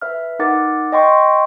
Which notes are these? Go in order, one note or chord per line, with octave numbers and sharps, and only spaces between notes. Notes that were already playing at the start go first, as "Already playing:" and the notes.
B4 E5 F6
D#4 A#4 F#5 D6 A6
D#5 G5 C6 C#6